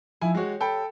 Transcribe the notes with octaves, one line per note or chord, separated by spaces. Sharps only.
F3 D#4 E4 G#5
G#3 F#4 G4 C#5
A4 G5 B5